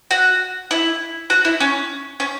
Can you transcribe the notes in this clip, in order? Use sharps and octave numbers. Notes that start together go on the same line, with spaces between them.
F#4
E4
F#4
E4
C#4
C#4